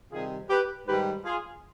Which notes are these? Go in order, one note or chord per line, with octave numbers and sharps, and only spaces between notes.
C3 D#3 G3 F4 G#4
G4 B4
G#2 D#3 G3 G4 B4
F4 G#4